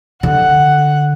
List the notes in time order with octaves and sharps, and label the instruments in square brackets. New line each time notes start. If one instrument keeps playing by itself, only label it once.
[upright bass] D3 [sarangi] F#5